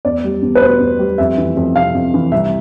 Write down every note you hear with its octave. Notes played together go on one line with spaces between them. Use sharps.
E2 D5
G3
E2
B4
B2 C5
E2
G3
F2 E5
E3
F2
C3 F5
F2
E3
C2 E5